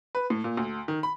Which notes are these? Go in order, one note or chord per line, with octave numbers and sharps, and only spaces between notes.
B4
A2
A#2
D2
D#3
B5